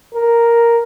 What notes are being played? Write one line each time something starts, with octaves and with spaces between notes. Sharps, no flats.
A#4